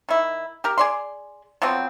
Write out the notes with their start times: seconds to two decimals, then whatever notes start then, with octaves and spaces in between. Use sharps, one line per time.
0.09 D#3 E4
0.64 G4 A#4
0.78 G#4 D5 C6
1.62 F3 F#3 B3 C4